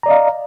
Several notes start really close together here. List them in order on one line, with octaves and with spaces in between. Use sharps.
A#5 D5 D#5 F5